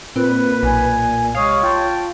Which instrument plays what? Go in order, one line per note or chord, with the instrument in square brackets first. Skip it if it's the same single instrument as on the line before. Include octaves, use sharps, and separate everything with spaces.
[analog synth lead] A#2 [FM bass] C4 [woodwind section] B4
[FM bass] B1 [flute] G#5
[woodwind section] C3 G#3 D#6 [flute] C#5 [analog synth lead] F5
[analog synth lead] F4 [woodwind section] G5 A5